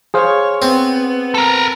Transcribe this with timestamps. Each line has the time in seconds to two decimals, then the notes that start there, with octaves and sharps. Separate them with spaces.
0.14 G#4 C5 C#5 F5
0.62 B3 C4
1.34 A4 A#4